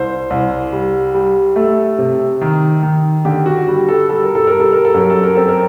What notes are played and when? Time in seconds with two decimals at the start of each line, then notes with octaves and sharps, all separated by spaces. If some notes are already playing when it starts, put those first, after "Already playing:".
Already playing: C2 C5
0.30 C2
0.72 G3
1.14 G3
1.56 A3 A4
1.98 C3
2.41 D#3
2.83 D#3
3.25 D3 G4
3.46 F#4
3.67 G3 F#4
3.89 A4
4.09 G3 A4
4.23 A#4
4.35 A4
4.47 G3 A#4
4.60 A4
4.72 A#4
4.85 A4
4.94 F#2 A#4
5.10 A4
5.24 A#4
5.35 C4 A4
5.49 A#4